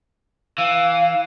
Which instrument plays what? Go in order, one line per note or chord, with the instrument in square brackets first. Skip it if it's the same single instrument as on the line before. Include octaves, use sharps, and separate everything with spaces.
[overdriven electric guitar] E3 [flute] F5